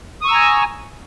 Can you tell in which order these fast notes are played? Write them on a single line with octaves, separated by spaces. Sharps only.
D#6 C#6 E6 A#5 G#5